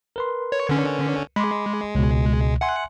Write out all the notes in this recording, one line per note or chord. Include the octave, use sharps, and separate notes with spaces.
A#4 B4 C6
C#5
D3 C#4
G#3 B5 C6 D6
C#2 B2
E5 F#5 G#5 C6